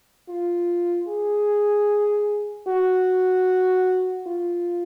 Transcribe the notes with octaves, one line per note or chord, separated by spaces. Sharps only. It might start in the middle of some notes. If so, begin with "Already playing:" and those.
F4
G#4
F#4
F4